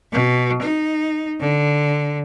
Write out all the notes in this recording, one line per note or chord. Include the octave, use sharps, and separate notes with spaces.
B2
D#4
D3